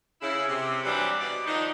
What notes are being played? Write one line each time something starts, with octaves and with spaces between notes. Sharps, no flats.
C#3 E4
C3
E3 F#3 G3 C4 D4 B4
B2 D5
D#3 F3 D4 D#4